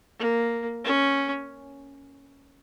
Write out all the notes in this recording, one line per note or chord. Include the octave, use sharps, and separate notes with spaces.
A#3
C#4